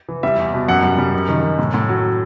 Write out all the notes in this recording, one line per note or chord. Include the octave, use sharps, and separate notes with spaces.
E3
G3 E5
E2
B2
F#2 F#5
G3
G3
F#2
D#3
F#2
A2
A2
F#3